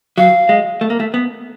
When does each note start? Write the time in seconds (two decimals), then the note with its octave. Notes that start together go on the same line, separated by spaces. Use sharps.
0.18 F#3 F5
0.49 G#3
0.81 A3
0.90 A#3
1.00 A3
1.14 B3